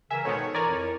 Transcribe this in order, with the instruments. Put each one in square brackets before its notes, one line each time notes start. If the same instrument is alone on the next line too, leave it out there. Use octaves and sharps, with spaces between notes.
[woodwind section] C#3 E3 A#4 [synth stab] E5 [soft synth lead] G#5
[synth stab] G#2 B2 D#3 [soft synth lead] A4 [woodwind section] C#5
[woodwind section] E3 F4 C#6 [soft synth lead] A#4 [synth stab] D5 G#5 A#5
[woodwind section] F2 E4 C#5